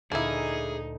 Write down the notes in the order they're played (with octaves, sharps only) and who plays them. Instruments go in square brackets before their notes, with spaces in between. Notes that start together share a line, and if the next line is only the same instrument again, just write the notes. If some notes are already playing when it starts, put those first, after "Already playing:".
[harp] D2 A#2 [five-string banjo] A#3 E4 [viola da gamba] D#4 [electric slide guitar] G#4